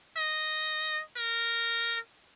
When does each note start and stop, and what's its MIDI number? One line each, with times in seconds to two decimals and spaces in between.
0.17 1.01 75
1.17 1.97 70